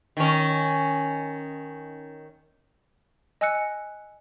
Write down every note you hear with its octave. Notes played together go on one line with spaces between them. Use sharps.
D#3 C#4
D#5 G#5 E6 F#6 C#7